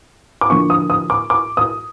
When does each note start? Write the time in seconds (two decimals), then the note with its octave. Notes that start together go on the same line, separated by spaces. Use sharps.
0.41 D6
0.50 D3 F3 A#3 C#6
0.70 D#6
0.90 D#6
1.10 D6
1.30 D6
1.57 D#6